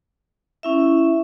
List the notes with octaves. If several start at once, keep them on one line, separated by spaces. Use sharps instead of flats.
C#4 E4 E5